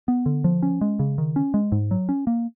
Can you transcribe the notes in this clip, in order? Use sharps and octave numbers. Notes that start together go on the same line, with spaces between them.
B3
D3
F3
C#4
G#3
C#3
D#3
C#4
G#3
G#2
F#3
C#4
A#3